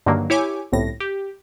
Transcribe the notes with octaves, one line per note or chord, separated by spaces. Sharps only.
G2 D3 D#3 F#3 A#3
E4 G4 C#5 G#5 D6
G1 C2 A2 A#6
G4